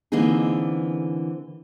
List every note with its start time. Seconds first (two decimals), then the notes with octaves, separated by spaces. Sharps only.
0.12 D3 E3 A#3 C4 D#4 G#4